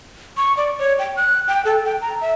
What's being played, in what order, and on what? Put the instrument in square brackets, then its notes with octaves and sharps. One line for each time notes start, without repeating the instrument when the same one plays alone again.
[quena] C#6
D5
C#5
G5
F#6
G5
A4
G5
A#5
E5